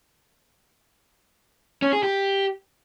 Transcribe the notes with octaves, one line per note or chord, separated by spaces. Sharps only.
C#4
G#4
G4